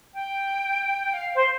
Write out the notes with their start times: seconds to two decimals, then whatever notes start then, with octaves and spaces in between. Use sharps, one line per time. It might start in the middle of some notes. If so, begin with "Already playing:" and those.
0.14 G5
1.13 F5
1.35 C5